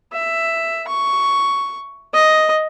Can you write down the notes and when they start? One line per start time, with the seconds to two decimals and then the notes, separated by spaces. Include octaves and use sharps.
0.13 E5
0.88 C#6
2.14 D#5